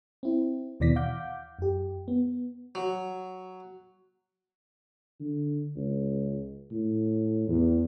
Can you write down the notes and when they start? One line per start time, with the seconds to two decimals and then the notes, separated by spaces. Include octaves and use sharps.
0.23 C4 E4
0.80 D#2 B2 E3 D5 A#6 B6
0.96 F5 F#5 D6 G6
1.59 F#2 G4
2.08 B3
2.75 F#3
5.20 D3
5.76 C#2
6.71 A2
7.48 E2